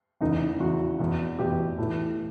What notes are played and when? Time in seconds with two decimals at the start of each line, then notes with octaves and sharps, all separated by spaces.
0.21 E2 C#3 E3 D#4
0.60 E2 C#3 E3 F#4
0.99 E2 B2
1.39 E2 B2 G4
1.78 A2 E3